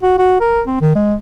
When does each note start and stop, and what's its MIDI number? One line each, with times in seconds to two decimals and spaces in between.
0.03 0.14 66
0.18 0.38 66
0.40 0.61 70
0.67 0.76 60
0.81 0.92 51
0.95 1.14 56